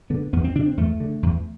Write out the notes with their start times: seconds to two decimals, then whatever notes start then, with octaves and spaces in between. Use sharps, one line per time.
0.10 D3 B3
0.33 E2 B3
0.44 C4
0.55 D3 D4
0.66 C4
0.77 E2 A3
1.00 D3
1.23 E2